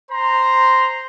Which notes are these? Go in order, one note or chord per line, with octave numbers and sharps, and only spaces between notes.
C5 A#5 C6